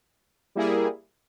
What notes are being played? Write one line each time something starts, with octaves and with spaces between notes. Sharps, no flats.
G3 A#3 E4 G#4